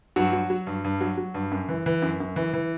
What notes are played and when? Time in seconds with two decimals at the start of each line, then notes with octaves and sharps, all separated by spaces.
0.16 G2 F#3 F#4
0.33 F#3
0.50 F#3
0.67 G2
0.84 G2
1.01 F#3
1.18 F#3
1.34 G2
1.52 F#2
1.69 E3
1.86 E3
2.02 F#2
2.20 F#2
2.36 E3
2.53 E3